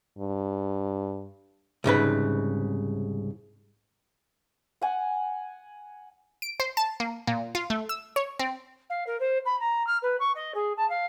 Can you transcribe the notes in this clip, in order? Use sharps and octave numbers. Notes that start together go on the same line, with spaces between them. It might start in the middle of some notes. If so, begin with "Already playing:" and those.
G2
C2 G#2 C#3 B4
F#5 G#5
D7
C5
A5
A#3
A#2
F4
A3
E6
C#5
C4
F5
A#4
C5
B5
A#5
F6
B4
C#6
D#5
G#4
A5
F5